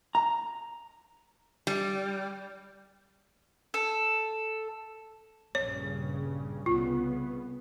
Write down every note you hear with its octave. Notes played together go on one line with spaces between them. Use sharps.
A#5
G3
A4
A#1 G2 C#3 C#5
C2 C#3 B3 F4